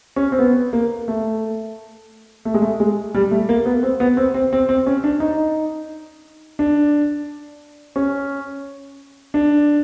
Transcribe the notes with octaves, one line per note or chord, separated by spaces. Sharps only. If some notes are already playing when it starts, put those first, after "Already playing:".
C#4
C4
B3
A#3
A3
A3
G#3
A3
G#3
G3
A3
A#3
B3
C4
B3
C4
C4
C4
C4
C#4
D4
D#4
D4
C#4
D4